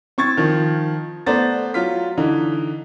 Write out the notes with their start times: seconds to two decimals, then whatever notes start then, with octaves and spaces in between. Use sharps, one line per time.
0.18 C4 C#6 G#6 A6
0.37 D#3 F3
1.26 A3 B3 C5 D5 A#5 A6
1.74 F#3 F4 F6 B6
2.17 D3 E3 D#4